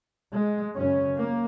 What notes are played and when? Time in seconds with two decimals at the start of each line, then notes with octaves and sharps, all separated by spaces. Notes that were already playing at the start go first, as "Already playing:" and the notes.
0.33 G#3
0.75 F#2 C#3 C#4
1.17 A#3